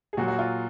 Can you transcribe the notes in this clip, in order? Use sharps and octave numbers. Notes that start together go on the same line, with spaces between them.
G#4
A#2 F#3 F#4
F#4
F4